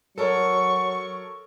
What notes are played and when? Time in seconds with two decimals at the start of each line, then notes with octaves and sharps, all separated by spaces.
0.18 F#3 A4 A#4 C#5 C#6